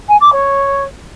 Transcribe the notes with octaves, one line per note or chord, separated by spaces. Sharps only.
G#5
D6
C#5